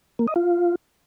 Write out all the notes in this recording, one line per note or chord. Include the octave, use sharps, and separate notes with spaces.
A#3
D#5
F4